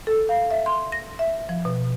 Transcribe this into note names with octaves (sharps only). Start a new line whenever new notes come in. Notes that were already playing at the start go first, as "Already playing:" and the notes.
A4
F5
E5
C6
A#6
E5
F3
B2